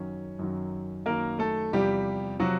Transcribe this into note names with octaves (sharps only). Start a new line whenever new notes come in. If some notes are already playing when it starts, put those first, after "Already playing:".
Already playing: F#2 D#3 F#3 C#4
F#2 D#3 F#3
F#2 D#3 F#3 A#3 A#4
A3 A4
E2 C3 F3 G3 G4
C3 F3 F#3 F#4